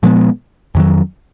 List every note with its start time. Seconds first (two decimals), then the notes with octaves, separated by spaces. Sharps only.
0.03 A#2 F3 G#3 B3
0.75 F2 D#3 F#3